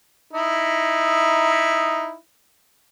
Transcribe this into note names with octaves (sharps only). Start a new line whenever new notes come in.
D#4 E4